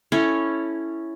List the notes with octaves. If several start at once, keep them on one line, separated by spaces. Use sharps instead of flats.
C#4 E4 A4 C#5